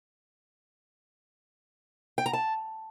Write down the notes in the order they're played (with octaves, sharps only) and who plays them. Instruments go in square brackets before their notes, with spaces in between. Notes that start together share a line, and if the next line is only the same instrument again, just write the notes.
[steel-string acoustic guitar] G5
A#5
A5